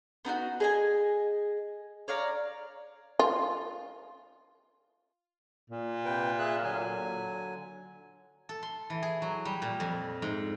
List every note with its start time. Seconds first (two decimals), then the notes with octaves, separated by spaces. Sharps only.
0.25 B3 D#4 F4 F#4
0.60 G#4 D#5 G#5
2.08 C#5 D5 F5 A#5
3.19 F4
5.70 A#2
6.05 C3 B4 G5
6.39 G#4 E5 F#6
6.63 D3 F#3 G#5
8.49 A4
8.63 C6
8.90 E3
9.03 G#4
9.22 F#3
9.45 G3
9.62 A#2
9.80 F2
10.22 G#2